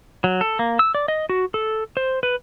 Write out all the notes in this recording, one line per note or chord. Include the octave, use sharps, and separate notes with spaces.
F#3
A4
A#3
E6
D5
D#5
F#4
A4
C5
B4